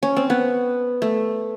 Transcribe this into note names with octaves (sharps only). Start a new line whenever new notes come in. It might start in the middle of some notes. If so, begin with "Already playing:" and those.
C#4
C4
B3
A3